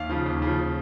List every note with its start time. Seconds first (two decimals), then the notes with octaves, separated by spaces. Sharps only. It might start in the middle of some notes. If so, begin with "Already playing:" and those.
Already playing: D#2 F5
0.09 C#3 F3
0.26 D#2
0.42 C#3
0.47 F3